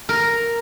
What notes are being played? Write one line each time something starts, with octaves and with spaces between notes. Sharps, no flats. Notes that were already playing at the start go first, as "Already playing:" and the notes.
A#4